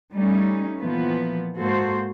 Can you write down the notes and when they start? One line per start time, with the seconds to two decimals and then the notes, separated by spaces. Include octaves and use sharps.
0.14 G3 A3 C#4 D#4
0.77 A#2 E3 F3 B3
1.58 G#2 A#3 F#4 A4 C5